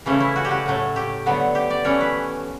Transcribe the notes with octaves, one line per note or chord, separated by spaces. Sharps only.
C#3 E3 A3 C#4
E4
F#4
G4
F#4
A2 F#3 A3
G4
D3 F#3 B3
G4
D5
E3 A3 C#4 C#5
B4